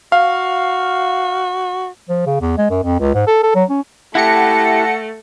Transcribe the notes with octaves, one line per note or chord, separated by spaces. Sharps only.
F#4 F5
F3
C#3
E2
G#3
F#2
F2
C#2
G#2
A4
A4
F#3
C#4
A3 E4 G4 F#5 A5 A#6 C#7